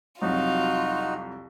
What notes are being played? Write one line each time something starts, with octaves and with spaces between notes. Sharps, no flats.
C2 F2 F#3 D#4 F4 F#4